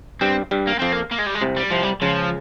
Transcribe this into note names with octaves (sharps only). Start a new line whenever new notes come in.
G2 G3 C4
G2 G3
A#3
F2 F3 C4
A#3
A#3
G#3
G3
G#3
C2 C3
G3
C2 C3 F3
G3
C#2 C#3 F3